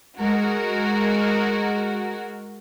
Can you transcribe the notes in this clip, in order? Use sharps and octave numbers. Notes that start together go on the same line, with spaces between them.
G#3 F#4 A#4